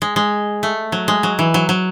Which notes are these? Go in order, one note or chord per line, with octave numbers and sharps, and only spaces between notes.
G#3
G#3
A3
F#3
G#3
F#3
E3
F#3
F#3